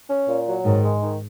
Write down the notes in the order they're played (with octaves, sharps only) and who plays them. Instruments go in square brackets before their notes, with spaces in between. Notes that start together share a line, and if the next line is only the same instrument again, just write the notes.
[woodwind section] C#4
A#2
F#3
[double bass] G#2 [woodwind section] D#3
[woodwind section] G#3
D#3